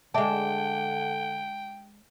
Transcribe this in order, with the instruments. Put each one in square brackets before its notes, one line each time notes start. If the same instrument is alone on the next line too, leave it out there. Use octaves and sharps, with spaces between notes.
[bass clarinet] D3 [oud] G#3 D4 [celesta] E5 A5 [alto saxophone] G5